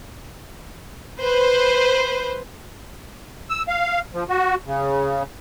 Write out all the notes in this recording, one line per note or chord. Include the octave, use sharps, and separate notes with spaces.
B4 C5
E6
F5
F3
F#4
C#3